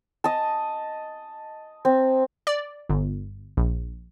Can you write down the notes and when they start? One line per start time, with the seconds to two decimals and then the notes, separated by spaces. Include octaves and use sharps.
0.24 D#5 A5
1.85 C4
2.47 D5
2.89 G1
3.57 A#1